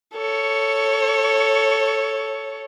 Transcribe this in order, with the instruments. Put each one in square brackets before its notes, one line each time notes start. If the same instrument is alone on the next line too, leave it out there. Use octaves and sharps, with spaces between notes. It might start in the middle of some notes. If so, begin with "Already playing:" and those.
[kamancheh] A4 C#5